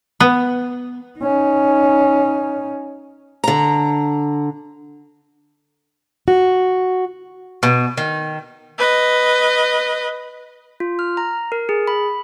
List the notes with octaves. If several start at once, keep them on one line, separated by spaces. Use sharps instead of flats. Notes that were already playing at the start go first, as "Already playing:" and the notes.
B3
C#4 D#4
D3 A#5
F#4
B2
D#3
B4 D#5
F4
F6
A#5
A#4
G#4
B5